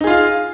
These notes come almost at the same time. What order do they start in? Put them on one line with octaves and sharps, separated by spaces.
D#4 G#4 F4 F5